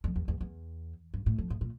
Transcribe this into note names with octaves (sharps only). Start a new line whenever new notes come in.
F2
E2
E2
E2
G2
A2
F2
A2
A#2